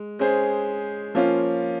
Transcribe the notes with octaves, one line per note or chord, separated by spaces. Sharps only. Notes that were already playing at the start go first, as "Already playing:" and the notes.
Already playing: G#3
G#3 C#4 G#4 C5
F3 A#3 C#4 F4